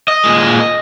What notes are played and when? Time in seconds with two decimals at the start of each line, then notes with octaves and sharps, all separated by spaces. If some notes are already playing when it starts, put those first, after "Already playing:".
0.08 D#5
0.24 A#2 G#3